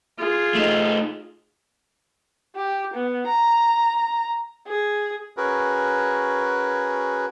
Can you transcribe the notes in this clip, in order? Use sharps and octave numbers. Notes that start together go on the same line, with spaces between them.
F4 G#4
A3 D#4
G4
B3
A#5
G#4
C#4 F#4 G#4 A#4 B4